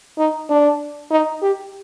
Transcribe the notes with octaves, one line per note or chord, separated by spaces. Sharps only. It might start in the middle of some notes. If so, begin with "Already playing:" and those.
D#4
D4
D#4
G4